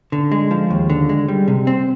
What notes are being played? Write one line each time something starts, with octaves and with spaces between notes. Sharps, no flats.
D3
G#3
F3
D#2
D3
G#3
G3
C3
C4